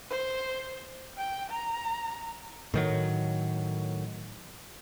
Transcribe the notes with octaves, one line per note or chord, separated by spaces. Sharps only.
C5
G5
A#5
A2 D#3 F#3